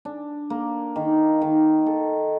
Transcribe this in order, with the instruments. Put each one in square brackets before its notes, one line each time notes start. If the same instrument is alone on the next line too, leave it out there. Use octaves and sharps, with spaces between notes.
[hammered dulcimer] D4
A#3
D#3
D#3
A4